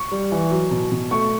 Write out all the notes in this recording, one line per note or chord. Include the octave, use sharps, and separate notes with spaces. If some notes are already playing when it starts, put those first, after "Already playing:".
Already playing: C#6
G3
E3
F#3
B2
B2
A3 C#6